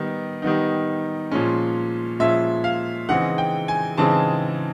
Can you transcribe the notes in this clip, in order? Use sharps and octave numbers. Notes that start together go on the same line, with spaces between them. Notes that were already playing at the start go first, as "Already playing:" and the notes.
Already playing: D#3 G3 B3 D#4
D#3 G3 B3 D#4
A#2 F3 G#3 C#4
A#2 F3 G#3 C#4 E5
F5
C#3 E3 G#3 C4 D#4 F#5
G5
G#5
C#3 E3 G#3 C4 D#4 A5